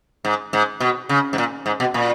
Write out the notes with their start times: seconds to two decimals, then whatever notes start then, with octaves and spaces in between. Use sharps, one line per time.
0.25 G#2
0.53 G#2
0.80 B2
1.09 C#3
1.33 G#2
1.38 A#2
1.66 G#2
1.80 B2
1.94 A#2